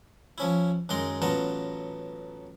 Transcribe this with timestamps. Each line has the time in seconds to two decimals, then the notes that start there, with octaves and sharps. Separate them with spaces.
0.38 F3 C#4 E4
0.89 F#2 D#3 G#3 A#5 C6
1.22 A1 F#3 B3 F4 A5 A#5